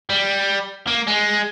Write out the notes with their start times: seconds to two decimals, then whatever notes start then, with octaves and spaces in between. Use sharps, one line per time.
0.10 G3
0.87 A#3
1.07 G#3